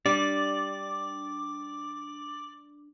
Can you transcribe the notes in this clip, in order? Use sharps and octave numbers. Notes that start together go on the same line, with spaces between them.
G3 D4 D5 D6